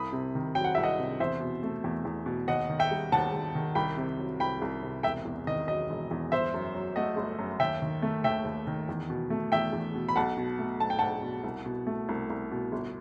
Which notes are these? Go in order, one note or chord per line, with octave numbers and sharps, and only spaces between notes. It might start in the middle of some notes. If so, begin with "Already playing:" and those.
Already playing: C2 B5 D#6
C3
D#3
F#3 G5
F#5
C2 E5
D#5 F#5
C3
E2 C5 E5
B2
A3
E2
E2
B2
D#2 D#5 F#5
D#3
E5 G5
G3
D#2 F#5 A5
D#2
D#3
C2 G5 B5
C3
F#3
C2 G5 B5
C2
C3
E1 E5 G5
E2
D#3 D#5
F#3 D#5
E1
E2
G1 C5 E5
F#2
F#3
A3 D#5 F#5
G1
F#2
D#2 E5 G5
D#3
A3
D#2 E5 G5
D#2
D#3
E2
B2
A3
E2 E5 G5
E2
B2
B5
B1 F#5 A5
B2
A3
B1 A5
G5
B1 F#5 A5
B2
C2
B2
A3
C2
C2
B2
G1